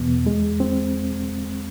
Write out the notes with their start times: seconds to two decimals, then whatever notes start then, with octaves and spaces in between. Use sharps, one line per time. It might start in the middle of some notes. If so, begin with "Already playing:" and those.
Already playing: E2 B2 B3
0.27 G#3
0.60 C4